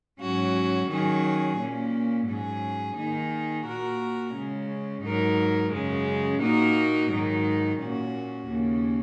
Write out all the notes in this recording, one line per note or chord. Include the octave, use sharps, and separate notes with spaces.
G#2 F#3 C#4 F#4
D#3 F#3 C#4 G#4
A#2 A#3 C#4
G#2 F#3 C#4 G#4
D#3 A#3 D#4 G#4
A#2 A#3 F#4 A#4
C#3 G#3 C#4
G#2 F#3 D#4 A#4
F#2 C#3 G#3 C#4
A#2 A#3 D#4 F#4 A#4
G#2 D#3 F#3 D#4
A#2 A#3 C#4 F#4
D#2 C#3 A#3 C#4